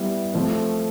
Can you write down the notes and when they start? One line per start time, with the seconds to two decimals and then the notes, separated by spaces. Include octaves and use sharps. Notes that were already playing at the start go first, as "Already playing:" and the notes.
Already playing: G3 B3 E4
0.34 F3 A3 C4